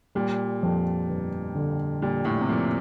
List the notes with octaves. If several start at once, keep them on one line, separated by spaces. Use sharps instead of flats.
A#2 G3
F2
G1
D3
A#2 G3
A2
C3
F2 A#2